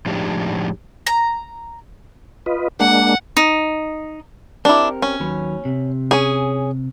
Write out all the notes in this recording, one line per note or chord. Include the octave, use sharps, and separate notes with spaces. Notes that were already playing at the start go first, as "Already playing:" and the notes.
A2 F3 G#3 D4 D#4 G4
A#5
F4 B4 D#5
G#3 A#3 D4 F#5
D#4
C4 D4 E4 G4 A#4
C#4
D#2 F#3 B4
C3
C#4 G#4